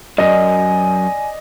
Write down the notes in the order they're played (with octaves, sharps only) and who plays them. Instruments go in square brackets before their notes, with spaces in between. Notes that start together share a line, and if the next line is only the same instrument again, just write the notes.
[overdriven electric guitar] F#2 [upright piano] D5 D#5 [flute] G#5